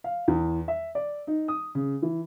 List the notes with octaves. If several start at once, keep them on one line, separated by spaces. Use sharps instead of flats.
F5
E2
E5
D5
D#4
D#6
C#3
E3